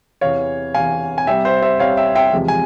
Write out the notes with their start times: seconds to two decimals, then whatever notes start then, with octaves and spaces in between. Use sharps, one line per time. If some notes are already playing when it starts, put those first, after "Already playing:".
0.21 E2 C3 E3 C#5 F5
0.74 E2 C3 E3 F5 G#5
1.18 G#5
1.27 C2 C3 G3 C4 E5 G5
1.45 C5 E5
1.62 C5 E5
1.79 C2 C3 G3 C4 C#5 F5
1.97 E5 G5
2.15 E5 G5
2.33 E2 C3 F3 G#3
2.48 G#5